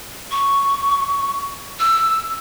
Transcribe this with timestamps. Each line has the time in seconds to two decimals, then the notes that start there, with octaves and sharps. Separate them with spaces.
0.31 C#6
1.80 E6